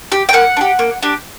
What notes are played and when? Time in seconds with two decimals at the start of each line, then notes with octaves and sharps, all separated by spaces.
0.12 G4
0.29 G5
0.33 A#3 F#5
0.57 D4
0.61 G4
0.79 A#3
1.02 D4 G4